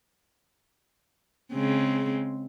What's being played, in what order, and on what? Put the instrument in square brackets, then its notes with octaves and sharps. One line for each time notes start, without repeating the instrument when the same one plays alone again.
[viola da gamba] C#3 G#3 C4